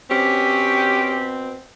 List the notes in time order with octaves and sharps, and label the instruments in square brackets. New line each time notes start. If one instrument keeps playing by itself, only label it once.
[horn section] B2 C4 [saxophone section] C#4 G4 [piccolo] B6